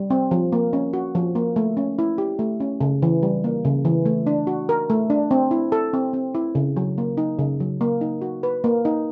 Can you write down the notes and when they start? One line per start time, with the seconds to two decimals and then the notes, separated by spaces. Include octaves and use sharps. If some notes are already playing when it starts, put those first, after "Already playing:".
Already playing: G3
0.10 C4
0.31 F3
0.52 A#3
0.73 C#4
0.93 F#4
1.15 F3
1.35 A#3
1.56 A3
1.77 C#4
1.99 E4
2.18 G4
2.39 A3
2.60 C#4
2.81 C#3
3.02 E3
3.23 G3
3.44 A#3
3.65 C#3
3.85 E3
4.06 A3
4.27 D4
4.47 F#4
4.69 A#4
4.90 A3
5.10 D4
5.31 C4
5.51 E4
5.72 A4
5.93 C4
6.13 C4
6.35 E4
6.55 C#3
6.77 F#3
6.98 A#3
7.17 D#4
7.39 C#3
7.60 F#3
7.81 A#3
8.01 D#4
8.22 F#4
8.43 B4
8.64 A#3
8.85 D#4